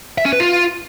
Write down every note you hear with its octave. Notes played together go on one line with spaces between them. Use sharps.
E5
C#4
B4
F4